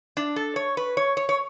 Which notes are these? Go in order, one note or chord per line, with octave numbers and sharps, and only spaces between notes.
D4
A4
C#5
B4
C#5
C#5
C#5